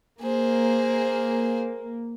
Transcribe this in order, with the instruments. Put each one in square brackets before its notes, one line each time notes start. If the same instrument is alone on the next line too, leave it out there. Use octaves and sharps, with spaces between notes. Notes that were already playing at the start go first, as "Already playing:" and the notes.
[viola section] A#3 [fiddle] G#4 C5